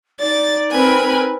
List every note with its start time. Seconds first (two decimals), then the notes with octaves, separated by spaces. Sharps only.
0.20 D#4 D5 A6
0.71 C4 A#4 B4 G#5 B5